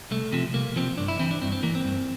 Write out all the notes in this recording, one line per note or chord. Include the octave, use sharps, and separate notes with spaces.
C2 A3
C3 F3
C2 A#3
C3 F3 C4
G2 D4
E4
E3 C4
D4
G2 C4
C4
E3 A#3
C4
G2